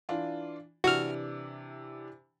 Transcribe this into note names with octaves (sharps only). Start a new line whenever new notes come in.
E3 D4 F4
C3 E3 D4 F#4 F6